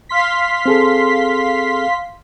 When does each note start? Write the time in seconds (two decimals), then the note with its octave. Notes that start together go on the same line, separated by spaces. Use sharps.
0.09 F5 C6 B6
0.66 C4 G#4 A4